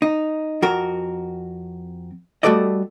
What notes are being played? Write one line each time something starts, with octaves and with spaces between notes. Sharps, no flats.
D#4
F2 F#4 A#4
G3 A3 F#4 A4 D5 D#5